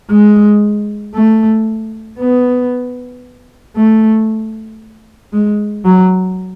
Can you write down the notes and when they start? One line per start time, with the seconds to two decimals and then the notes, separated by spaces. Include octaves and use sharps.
0.10 G#3
1.15 A3
2.19 B3
3.77 A3
5.33 G#3
5.85 F#3